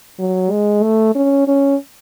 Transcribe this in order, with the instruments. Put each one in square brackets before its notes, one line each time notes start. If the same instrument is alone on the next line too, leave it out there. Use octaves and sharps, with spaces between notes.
[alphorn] F#3
G#3
A3
C#4
C#4